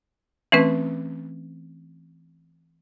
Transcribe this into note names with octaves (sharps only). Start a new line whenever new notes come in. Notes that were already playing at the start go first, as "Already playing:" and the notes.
E3 A3 C4 C#4 B4